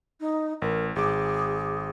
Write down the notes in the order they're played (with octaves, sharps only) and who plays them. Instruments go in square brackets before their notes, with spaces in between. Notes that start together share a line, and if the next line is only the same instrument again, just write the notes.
[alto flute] D#4
[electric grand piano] A1 [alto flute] A#4
[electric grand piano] G#1 D6 [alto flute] G#4